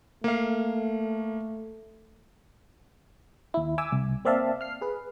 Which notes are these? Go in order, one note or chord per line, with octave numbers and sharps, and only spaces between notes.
A3 A#3 F5
D#2 E4
E5 G#5 D6 E6
C2
A#3 C4 D5 E5 F5 A5
F6 C7
G#4 B4